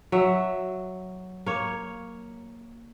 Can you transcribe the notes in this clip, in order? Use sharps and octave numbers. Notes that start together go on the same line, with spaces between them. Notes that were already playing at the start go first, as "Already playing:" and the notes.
F#3 E5
A#3 C#5